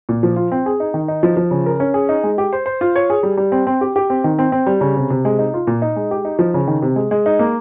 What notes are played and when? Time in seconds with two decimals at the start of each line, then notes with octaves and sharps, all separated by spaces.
0.09 A#2
0.23 F3
0.36 F4
0.52 C4
0.66 G#4
0.80 D#4
0.94 D#3
1.08 D#4
1.23 F3
1.37 F3
1.51 C#3
1.66 A#4
1.80 C#4
1.94 G#4
2.09 D#4
2.24 G#3
2.38 G4
2.53 C5
2.66 C5
2.81 F4
2.96 C#5
3.10 G#4
3.23 G3
3.37 G3
3.52 C4
3.67 C4
3.81 G4
3.96 G4
4.10 C4
4.24 D#3
4.39 C4
4.52 C4
4.67 G3
4.81 C#3
4.96 C3
5.10 C3
5.25 G#3
5.39 D#4
5.54 F4
5.67 A#2
5.82 D#4
5.96 G#3
6.11 G4
6.25 D#4
6.39 F3
6.54 C#3
6.67 D#3
6.82 C3
6.96 G#3
7.11 G#3
7.26 D#4
7.39 A#3